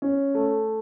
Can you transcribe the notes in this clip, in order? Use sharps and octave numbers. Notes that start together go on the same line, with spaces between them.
C#4
A3